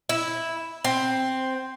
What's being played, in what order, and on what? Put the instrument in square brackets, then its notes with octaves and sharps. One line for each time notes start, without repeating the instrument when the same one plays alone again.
[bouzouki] E4
C4